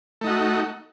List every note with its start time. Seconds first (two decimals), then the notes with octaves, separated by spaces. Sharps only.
0.21 A3
0.24 D#4
0.27 F#4